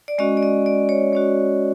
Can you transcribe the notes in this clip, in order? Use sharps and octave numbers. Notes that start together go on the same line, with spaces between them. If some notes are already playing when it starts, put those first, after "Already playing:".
D5
G#3 C#4 F#4 D#5
D5
D#5
D5
C#5
G#3 C#4 F#4 C#5